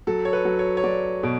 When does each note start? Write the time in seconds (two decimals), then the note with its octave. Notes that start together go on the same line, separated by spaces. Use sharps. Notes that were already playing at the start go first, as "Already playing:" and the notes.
0.07 F#3 A4
0.25 C#5
0.33 B4
0.45 F#3
0.59 C#5
0.77 C#5
0.84 F#3 D5
1.23 B2